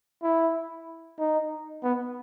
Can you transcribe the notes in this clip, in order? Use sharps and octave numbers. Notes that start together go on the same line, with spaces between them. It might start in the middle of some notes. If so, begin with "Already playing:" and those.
E4
D#4
B3